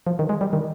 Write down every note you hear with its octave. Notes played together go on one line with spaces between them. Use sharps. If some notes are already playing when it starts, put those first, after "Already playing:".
F3
D#3
G#3
G3
D#3